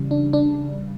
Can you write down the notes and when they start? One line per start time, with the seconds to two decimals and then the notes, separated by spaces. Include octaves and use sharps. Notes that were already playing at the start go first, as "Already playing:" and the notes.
Already playing: C#3 E3 G3
0.11 D4
0.33 D4